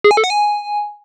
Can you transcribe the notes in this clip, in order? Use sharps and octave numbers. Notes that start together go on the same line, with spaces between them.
G#4
G#5
A4
F#5
G#5